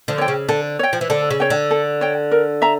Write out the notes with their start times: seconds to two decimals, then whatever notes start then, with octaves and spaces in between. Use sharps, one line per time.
0.08 D3 F3
0.18 C#5 G5
0.28 C#3
0.49 D3 A4
0.79 C#5 G5
0.93 F3
1.01 E3
1.10 D3 A4
1.30 C#3
1.40 C#5 G5
1.50 D3
1.71 A4
2.01 C#5 G5
2.31 A#4
2.62 E5 A#5